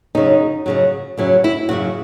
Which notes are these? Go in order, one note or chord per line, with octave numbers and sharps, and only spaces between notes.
F#2 C#3 F#3 D#4
F#2 C#3 F#3
F#2 C#3 F#3 E4
E4
F#2 C#3 F#3 F#4